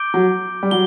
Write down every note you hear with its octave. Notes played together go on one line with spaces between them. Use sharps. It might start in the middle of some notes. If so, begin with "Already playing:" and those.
Already playing: D6 G6 D7 G7
F#3
G3
F#3 G7